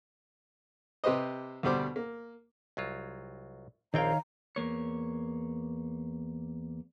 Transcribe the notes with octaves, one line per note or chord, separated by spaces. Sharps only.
C3 G4 B4 C5 D#5
D2 B2 G3 C5 D6
A#3
C2 F#3 F4
A#1 D#3 C4 C#5 F5 G5 A#5
E2 A#3 C#5